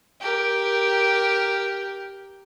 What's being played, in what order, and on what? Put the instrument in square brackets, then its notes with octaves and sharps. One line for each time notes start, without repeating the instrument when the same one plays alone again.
[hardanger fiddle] G4 A#4